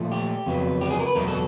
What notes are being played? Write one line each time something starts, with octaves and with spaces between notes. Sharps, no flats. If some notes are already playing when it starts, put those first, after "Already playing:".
Already playing: A#2 F3 A3
G4
F2 C#3 F#3 B3
G4
G#4
A#4
B4
E2 B2 F#3 B3 A#4
A4